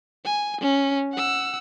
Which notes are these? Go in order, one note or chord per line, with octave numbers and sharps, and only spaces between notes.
G#5
C#4
F#5 E6